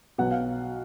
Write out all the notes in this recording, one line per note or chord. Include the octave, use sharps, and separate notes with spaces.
B1 B2 F#3 F#5
F5